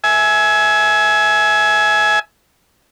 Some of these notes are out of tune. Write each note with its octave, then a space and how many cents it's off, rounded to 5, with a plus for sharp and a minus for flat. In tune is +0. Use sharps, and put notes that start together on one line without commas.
E5 -10 G#5 +20